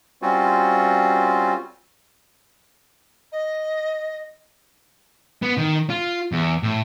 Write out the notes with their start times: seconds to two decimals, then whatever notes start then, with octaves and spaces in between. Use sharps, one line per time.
0.22 G3 C4 C#4 F4 F#4
3.32 D#5
5.42 B3
5.57 D#3
5.90 F4
6.32 E2
6.63 A2